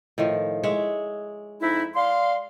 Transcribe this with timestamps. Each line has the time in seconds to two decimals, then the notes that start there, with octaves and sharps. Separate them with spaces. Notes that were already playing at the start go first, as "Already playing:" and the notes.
0.18 A2 D#3 F3
0.63 G#3 C#5 E5
1.62 F2 D#4 E4
1.95 D5 F5 C6